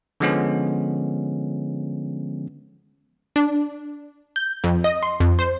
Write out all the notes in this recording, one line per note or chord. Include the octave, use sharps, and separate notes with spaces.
D3 F3 G#3 B3 C#4
D4
G6
F2
D#5
C6
F2
C5